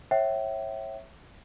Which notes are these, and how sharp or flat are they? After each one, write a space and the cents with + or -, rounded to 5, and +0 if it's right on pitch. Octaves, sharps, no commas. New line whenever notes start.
C#5 -25 E5 +0 G5 -35